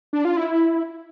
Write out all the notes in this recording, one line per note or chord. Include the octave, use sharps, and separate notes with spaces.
D4
F4
E4